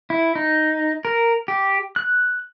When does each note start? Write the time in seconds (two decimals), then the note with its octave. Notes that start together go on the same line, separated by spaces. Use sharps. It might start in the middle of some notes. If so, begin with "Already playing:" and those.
0.10 E4
0.35 D#4
1.05 A#4
1.48 G4
1.96 F#6